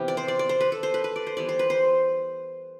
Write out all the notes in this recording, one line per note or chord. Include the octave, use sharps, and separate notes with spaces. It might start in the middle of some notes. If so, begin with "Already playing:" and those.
Already playing: C3 E3 B3 G4
D5
C5
D5
D5
C5
B4
A4
C5
B4
B4
D5
C5
E3 G3 B3 D5
C5
B4
C5